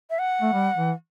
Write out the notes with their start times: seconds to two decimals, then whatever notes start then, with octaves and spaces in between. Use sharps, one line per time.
0.10 E5
0.19 F#5
0.42 A3
0.53 G3
0.76 E3